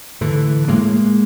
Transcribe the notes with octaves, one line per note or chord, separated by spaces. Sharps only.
A2 D3 E3
A2 G#3 A#3